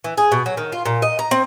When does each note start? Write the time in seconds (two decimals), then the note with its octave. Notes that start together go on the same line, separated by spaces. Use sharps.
0.04 E3
0.18 G#4
0.32 B2
0.46 F#3
0.57 D#3
0.72 F4
0.86 A#2
1.02 D#5
1.19 A#5
1.31 C4